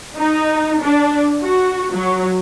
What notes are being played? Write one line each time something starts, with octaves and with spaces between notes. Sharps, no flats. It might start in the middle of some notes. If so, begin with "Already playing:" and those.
D#4
D4
F#4
F#3